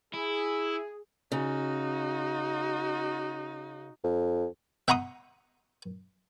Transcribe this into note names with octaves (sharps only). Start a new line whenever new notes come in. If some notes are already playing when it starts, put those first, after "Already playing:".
E4 G#4
C#3 D#4 F#4
F2
E5 F#5 A#5 C6 D#6